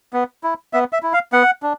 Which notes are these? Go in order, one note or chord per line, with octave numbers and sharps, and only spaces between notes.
B3
E4
B3 E5
E5
E4
F5
B3 F#5
D4